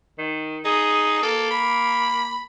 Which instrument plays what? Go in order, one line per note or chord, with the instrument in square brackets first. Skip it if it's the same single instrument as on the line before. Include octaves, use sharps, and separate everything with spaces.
[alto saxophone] D#3
[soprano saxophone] D#4 [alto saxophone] G#4
[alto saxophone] A#3 [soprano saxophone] A4
[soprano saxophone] B5